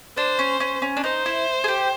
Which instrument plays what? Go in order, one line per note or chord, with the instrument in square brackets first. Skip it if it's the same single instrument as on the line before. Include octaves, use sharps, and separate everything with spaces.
[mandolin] D4 [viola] C5
[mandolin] C#4
C#4
C#4
D4
[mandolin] D#4 [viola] C5
[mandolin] E4
G#4
G4